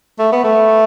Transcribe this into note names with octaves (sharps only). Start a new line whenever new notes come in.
A3
B3
A3